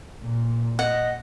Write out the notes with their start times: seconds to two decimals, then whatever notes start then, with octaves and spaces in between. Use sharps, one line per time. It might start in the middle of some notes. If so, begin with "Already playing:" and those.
0.21 A#2
0.79 D#5 F#5